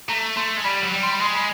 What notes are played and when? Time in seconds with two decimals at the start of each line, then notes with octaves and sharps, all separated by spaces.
0.09 A3 A#5
0.36 A3 C6
0.57 G#3
0.64 G3 B5
0.83 F#3
0.92 G3
1.03 C6
1.12 B5
1.20 G#3 C6
1.34 B5